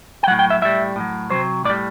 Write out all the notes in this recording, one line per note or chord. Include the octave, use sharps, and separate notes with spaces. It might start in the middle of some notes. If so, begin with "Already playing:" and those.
G5
A2 F#3 F#5
G5
E5
A2 G3 E5
A2 F#3
C3 F#3 C5
A2 D5
G3